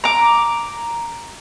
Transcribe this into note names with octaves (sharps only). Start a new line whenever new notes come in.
A#5 D6